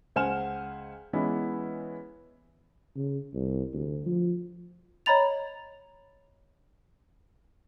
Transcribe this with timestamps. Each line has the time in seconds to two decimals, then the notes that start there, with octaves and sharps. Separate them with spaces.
0.16 C#2 C5 F#5 G#5 F6 E7
1.13 E3 G#3 B3 C#4 E4
2.96 C#3
3.34 C2
3.73 D2
4.06 F3
5.06 C#5 D#5 A#5 B5 A6 F7